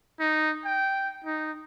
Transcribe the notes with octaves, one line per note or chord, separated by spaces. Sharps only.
D#4
G5
D#4